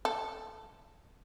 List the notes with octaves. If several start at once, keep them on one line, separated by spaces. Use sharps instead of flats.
A4